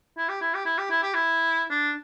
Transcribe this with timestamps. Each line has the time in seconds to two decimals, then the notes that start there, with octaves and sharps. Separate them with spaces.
0.17 E4
0.29 G4
0.41 E4
0.54 G4
0.65 E4
0.78 G4
0.91 E4
1.03 G4
1.14 E4
1.70 D4